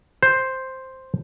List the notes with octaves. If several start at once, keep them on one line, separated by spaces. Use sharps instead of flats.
C5